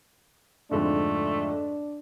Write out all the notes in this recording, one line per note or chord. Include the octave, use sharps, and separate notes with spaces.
F2 G#2 D3 A3 D4